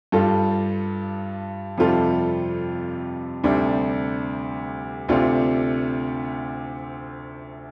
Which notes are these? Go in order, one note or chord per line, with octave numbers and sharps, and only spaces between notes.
G2 G3 F4 A4
F2 C3 G3 F4 A4
D2 C3 G3 D4
D2 C3 A3 D4 F4